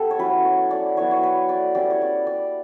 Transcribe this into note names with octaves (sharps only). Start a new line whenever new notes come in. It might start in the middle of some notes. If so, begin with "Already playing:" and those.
Already playing: B3 G4 A4
C#5
F#3 C#4 E4 B4
C#5
D5
F#3 B3 E4 C#5
C#5
B4
D5
G3 C#4 E4 D5
C#5
D5
D5